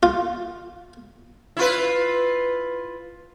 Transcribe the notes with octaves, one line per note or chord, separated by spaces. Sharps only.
F4
E4 F4 B4